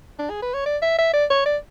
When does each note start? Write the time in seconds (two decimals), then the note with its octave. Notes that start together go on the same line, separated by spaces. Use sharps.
0.19 D4
0.30 G#4
0.42 B4
0.54 C#5
0.66 D5
0.82 E5
0.99 E5
1.14 D5
1.30 C#5
1.46 D5